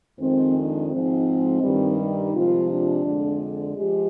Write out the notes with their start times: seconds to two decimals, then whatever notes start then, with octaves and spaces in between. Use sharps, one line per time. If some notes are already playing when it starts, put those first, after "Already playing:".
0.20 F2 D#3 G#3 C4
0.55 D4
0.91 G#2 F3 G#3 C4
1.62 G2 D#3 G3
1.98 D#4
2.34 C3 F3 G#3 F4
2.70 D4
3.06 F2 D3 G#3
3.77 F3 G#3 G4